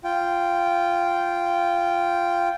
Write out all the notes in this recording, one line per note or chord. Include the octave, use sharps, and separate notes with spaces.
F4 G5